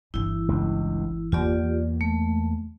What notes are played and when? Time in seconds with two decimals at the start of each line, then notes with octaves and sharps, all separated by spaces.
0.14 G1 E3 E4
0.48 C#2 G2
1.32 E2 A#3 F4 G4 D5
2.01 G#3 A3